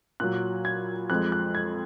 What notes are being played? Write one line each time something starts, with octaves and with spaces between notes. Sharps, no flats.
A#2 F#3 F#6
G#6
F2 F3 G#3 F#6
F#6
G#6